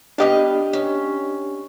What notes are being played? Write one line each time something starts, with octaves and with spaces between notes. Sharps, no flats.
B3 D4 G4 D#5 F5
C#4